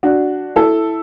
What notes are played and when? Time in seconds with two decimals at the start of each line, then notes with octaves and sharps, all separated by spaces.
0.03 D4 F#4
0.56 E4 A4